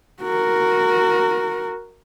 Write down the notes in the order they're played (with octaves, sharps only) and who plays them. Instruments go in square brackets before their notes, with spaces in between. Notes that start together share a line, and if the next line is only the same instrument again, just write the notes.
[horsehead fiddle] F#4 A#4